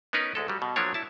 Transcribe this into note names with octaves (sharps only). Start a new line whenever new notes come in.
B3 C#4 D#4 A#4 B4
D2 G#3 A4
F#3 G3
B2
F3 F#3 A#3 D4 C#5
E4 A5